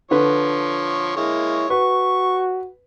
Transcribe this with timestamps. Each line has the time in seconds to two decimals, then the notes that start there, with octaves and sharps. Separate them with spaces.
0.11 D3 F3 B4 C#5
1.17 G#3 A#3 E4 C#5
1.70 F#4 B4 C#6